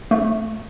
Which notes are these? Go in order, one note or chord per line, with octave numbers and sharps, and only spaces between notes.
A3